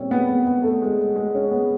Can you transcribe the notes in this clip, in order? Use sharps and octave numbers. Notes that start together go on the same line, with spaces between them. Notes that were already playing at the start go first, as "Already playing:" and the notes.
Already playing: A#2 G3 C4 C#4
B3
B3
B3
A3
G#3
G#3
C#4
B3